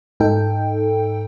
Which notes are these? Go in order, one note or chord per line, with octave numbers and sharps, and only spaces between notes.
G#2 D#4 A4 G5